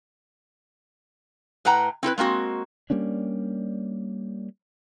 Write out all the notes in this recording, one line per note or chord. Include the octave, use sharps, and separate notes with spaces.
A2 B4 F#5 G5 A#5
C4 E4 A4 B4
G#3 A#3 C4 F#4
G3 A#3 C#4 D4